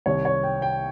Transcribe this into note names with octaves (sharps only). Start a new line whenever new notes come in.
C2 C3 D#3 C#5
C#5
G5
G5